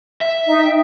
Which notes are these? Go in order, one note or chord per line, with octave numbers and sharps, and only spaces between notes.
E5
D#4 D#5
G5